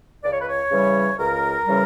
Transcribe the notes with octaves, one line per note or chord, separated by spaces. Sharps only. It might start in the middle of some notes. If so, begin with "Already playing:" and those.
C#2 D5
C#5
B4
C#5
C#3 E3 G3
C#2 A#4
C#3 E3 G3